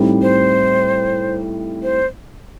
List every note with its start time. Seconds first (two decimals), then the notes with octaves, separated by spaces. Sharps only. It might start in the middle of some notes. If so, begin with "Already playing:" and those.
Already playing: A2 G3 C4 D#4
0.22 C5
1.83 C5